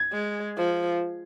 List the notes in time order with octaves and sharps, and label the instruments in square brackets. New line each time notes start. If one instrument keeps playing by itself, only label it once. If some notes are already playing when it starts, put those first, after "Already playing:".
Already playing: [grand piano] G#6
[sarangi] G#3
F3